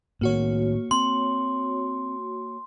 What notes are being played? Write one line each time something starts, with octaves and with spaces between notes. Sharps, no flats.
A2 D#3 A#3 F#4 C#5
C4 C6